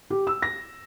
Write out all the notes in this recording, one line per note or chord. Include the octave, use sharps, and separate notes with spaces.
G4
E6
A#6